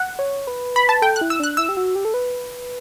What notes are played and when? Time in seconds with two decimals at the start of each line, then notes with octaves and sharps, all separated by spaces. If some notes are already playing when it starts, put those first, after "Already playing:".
Already playing: F#5
0.19 C#5
0.47 B4
0.76 B5
0.89 A5
1.02 A4 G5
1.16 F#6
1.21 E4
1.30 E6
1.40 D4 F#6
1.57 E4 E6
1.69 G4
1.77 F#4
1.95 G4
2.05 A4
2.14 B4